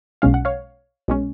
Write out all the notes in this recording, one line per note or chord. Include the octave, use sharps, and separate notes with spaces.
B1 B2 G#3 C#4 F5
F#5
C#5 F5
B1 B2 G#3 C#4